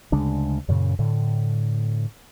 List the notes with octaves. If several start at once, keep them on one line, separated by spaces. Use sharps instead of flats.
D2 C#3 G#3 D4
F#2 A#2 C#3
A2 D3